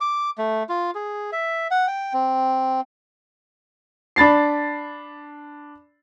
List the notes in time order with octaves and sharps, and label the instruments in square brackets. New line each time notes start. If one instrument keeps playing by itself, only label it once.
[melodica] D6
A3
F4
G#4
E5
F#5
G5
C4
[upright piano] D4 B5 A6 C7